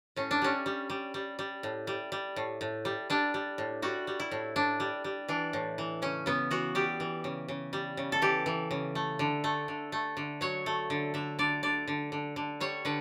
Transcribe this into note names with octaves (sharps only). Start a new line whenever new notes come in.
A2 C#4
D4
G3 C#4
G3
G3
G3
G3
A2
G3
G3
A2
A2
G3
G3 D4
G3
A2
G3 F#4
G3
E4
A2
A2 D4
G3
G3
E3 D4
A2
E3
C#3 C#4
C#3 B3
E3 F#4
G3 G4
E3
C#3
C#3
G3
C#3
A4
E3 G4
E3
C#3
A3
D3
A3
D3
A3
D3
F#3 C#5
A3
D3
D3 E5
D3 D5
D3 D5
D3
D3
D3
G3 C#5
D3 B4